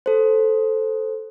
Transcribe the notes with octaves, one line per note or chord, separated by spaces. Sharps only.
A4 C5